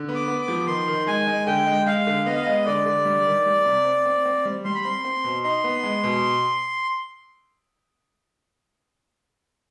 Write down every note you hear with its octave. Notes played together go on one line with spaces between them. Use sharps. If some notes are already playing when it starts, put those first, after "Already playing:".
Already playing: D3
B3
D6
B3
D6
F3
D#3 C6
D#3
G#3 G#5
G#3
D3 G5
G#3
G#3 F5
D3
B3 D#5
F5
G#3 D#5
D3 D5
D3
G3
D#3
G3
C3
C4
C4
C4
G3
G3 C6
B5
C4 C6
C4
B2
D#4 C6
B3
G#3
B2